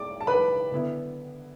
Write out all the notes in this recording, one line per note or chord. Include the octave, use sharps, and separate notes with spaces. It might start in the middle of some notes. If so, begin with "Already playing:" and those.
Already playing: D5 D6
A5
B4 B5
D3 B3 E4